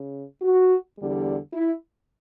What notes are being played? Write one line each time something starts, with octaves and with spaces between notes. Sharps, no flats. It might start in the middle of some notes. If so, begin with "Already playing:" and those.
Already playing: C#3
F#4
E2 D3 G3
E4